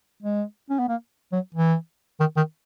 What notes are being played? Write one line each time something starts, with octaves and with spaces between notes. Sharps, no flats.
G#3
C#4
B3
A#3
F#3
E3
D#3
D#3